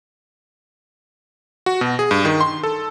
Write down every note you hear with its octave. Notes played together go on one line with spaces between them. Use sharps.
F#4
B2
G#4
G2
D#3
C6
A4